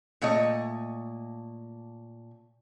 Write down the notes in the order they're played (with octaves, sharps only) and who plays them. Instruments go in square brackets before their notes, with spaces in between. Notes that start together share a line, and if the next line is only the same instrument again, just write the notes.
[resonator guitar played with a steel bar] A#2 A3 C#5 D#5